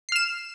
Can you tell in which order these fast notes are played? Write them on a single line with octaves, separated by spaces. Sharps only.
C7 F6 E7